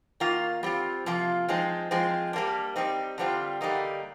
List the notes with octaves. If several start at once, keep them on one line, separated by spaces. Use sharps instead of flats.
D#3 A#3 F4
G3 C4 F4
C3 F3 A#3 F4
F3 G#3 C4 D#4
F3 G#3 C4
G3 A#3 D4
G3 C4 D#4
D3 G3 C4 F4
D3 G3 A#3 D#4